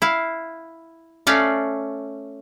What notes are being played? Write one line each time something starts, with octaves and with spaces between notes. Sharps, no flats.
E4 F5
A3 C#4 D5 F5